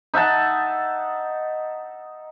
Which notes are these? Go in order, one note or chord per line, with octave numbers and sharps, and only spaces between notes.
D#4 E5 F#5 A5